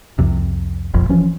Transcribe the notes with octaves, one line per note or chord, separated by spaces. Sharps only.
C2 F2 C3
F1 A#1 F2
E3 F3 C#4